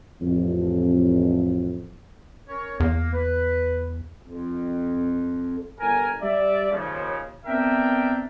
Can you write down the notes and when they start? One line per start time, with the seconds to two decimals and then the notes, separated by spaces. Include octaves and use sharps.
0.21 A1 F2
2.48 C#4 A#4 C#5
2.80 E2 A#3
3.14 B4
4.23 F2
5.79 G1 A#4 G#5
6.21 G3 D5 E5
6.71 D#2 C#3 F3
7.46 B3 C4 D4 A#4 E5 G5